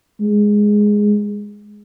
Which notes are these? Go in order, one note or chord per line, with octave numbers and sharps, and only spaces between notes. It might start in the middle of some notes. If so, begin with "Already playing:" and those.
G#3